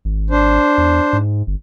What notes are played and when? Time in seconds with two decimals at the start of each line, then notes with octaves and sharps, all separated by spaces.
0.05 G#1
0.30 D4 C5
0.78 E2
1.13 G#2
1.47 G1